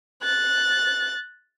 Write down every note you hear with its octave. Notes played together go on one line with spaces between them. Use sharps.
F#6 A6